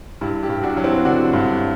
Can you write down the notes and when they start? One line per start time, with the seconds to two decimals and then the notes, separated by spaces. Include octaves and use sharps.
0.21 G2 E4 G4
0.43 E4 G4
0.49 G2
0.63 D4 F#4
0.77 F#3
0.84 C4 E4
1.05 D3 D4 F#4
1.33 G2